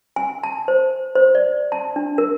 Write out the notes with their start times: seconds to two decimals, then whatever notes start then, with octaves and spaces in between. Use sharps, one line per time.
0.16 G#5
0.43 A5
0.68 C5
1.15 C5
1.35 D5
1.72 A5
1.96 D4
2.18 A#4